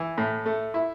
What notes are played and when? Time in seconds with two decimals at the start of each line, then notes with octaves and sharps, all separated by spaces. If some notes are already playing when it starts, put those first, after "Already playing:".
Already playing: E3
0.18 A2
0.46 A3
0.74 E4